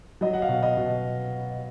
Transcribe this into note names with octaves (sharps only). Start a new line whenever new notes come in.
F#3 D#5
F#5
F5
B2
D#5
B2